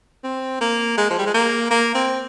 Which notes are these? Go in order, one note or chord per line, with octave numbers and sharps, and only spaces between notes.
C4
A#3
G#3
F3
G3
G#3
A#3
A#3
C4